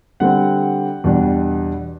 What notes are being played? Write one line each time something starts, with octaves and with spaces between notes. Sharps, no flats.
D3 G3 C4 F#5
E2 B2 G3 D4